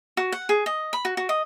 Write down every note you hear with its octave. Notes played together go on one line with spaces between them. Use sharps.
F#4
F#5
G#4
D#5
B5
F#4
F#4
D#5